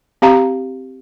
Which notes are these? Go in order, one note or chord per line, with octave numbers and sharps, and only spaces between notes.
C4 G4 F5 A#5